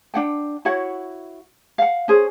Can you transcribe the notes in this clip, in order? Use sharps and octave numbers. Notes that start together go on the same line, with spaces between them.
D4 F#5 G5
E4 F#4 C#5 F#5
F5 F#5
C#4 G#4 C5